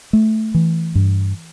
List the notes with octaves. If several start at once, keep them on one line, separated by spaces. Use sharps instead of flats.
A3
E3
G2